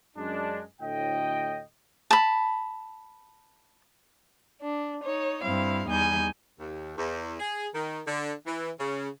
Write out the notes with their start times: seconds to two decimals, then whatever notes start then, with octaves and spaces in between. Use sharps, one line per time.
0.17 F#2 G#3 D4
0.81 D2 A2 D#5 G5
2.11 A5 B5
4.61 D4
5.03 D#4 C#5
5.43 G2 C4 E4 F5
5.88 E2 G3 D#4 G#5 G6
6.58 D#2
6.97 E2
7.39 G#4
7.73 D#3
8.06 D3
8.46 E3
8.79 C#3